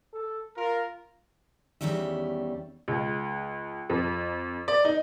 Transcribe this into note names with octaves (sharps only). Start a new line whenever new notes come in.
A4
F4 A#4
E2 G2 D#3 G3 C#4 E5
C#2
F2
D5
D#4